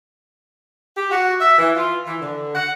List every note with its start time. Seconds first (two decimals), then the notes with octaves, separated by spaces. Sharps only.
0.96 G4
1.11 F#4
1.40 E5
1.57 E3
1.76 F4
2.06 E3
2.21 D3
2.55 F#5